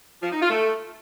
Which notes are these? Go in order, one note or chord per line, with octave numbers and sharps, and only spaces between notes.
F3
D#4
F4
A3